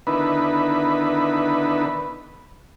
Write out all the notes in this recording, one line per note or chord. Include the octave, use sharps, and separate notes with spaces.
D3 D#3 B3 E4 B4